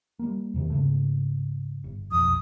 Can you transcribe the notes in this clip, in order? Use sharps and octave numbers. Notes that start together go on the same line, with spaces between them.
G3 A#3
E2 C3 D#3
G#2 C#3 A3
G1
B1 F2 D#6